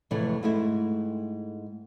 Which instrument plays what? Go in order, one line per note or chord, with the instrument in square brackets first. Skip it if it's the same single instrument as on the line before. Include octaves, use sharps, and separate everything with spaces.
[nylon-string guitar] F2 A2 C3 E3 G#3 A3
G#2 G#3 A3 C4 E4